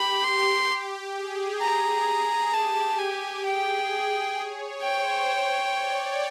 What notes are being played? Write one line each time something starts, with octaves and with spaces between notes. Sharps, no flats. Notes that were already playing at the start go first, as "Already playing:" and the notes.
Already playing: G4 B5
G4 C6
G#4
G#4 A#5
G4 A5
G#5
G#4 G5
C#5
C5 G5
C#5
D5